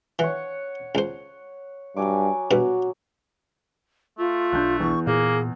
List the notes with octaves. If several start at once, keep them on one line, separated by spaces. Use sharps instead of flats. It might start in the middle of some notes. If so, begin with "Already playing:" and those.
E3 C#5 F#5
C#2 C5
G2 F#3 G#5 D6
G2 B2 F#4 B4
A3 F4
B1 F3 D4 F#6 G6
E2 C#6
A#2 A#3 G#4